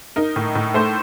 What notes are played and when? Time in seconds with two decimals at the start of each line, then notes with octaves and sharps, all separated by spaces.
0.16 D#4 A#4
0.36 A2
0.55 A2
0.74 A3 C5